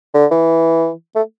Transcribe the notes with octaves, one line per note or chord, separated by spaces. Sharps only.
D3
E3
A3